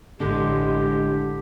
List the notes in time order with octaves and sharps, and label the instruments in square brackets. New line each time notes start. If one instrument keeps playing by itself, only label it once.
[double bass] A1 [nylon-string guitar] D3 [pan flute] G#3 [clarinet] G4